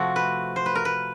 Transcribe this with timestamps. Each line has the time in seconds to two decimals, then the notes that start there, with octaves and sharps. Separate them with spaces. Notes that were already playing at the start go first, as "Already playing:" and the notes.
Already playing: C3 F3 A3 C4 F#4
0.16 B4
0.56 C5
0.66 B4
0.75 A#4
0.85 B4